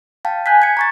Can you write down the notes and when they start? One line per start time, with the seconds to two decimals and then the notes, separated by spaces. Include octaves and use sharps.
0.25 F5 G5 A5
0.46 G#5 F#6 G6 B6
0.62 G#6 C#7
0.77 A#5 C#6 A6